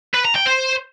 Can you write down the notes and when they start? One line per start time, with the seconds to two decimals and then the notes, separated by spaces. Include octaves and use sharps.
0.14 B4
0.25 A#5
0.36 G5
0.47 C5